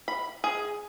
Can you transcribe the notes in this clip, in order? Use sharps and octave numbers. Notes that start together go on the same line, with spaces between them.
B5
G#4